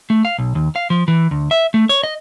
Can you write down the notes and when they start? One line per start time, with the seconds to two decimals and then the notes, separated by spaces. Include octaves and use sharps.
0.10 A3
0.25 F5
0.38 B1
0.55 D#2
0.76 F5
0.90 F3
1.08 E3
1.31 D2
1.51 E5
1.74 A3
1.89 C#5
2.03 D#5